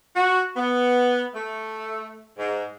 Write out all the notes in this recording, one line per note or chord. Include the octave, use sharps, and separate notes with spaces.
F#4
B3
A3
G#2